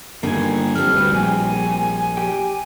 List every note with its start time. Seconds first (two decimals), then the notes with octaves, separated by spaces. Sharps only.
0.23 G2 D3 D#3 A#3 G#4 G#5
0.75 G3 C4 A4 F6
0.93 D2 B4
1.12 A#1 G#5
2.17 G4 G5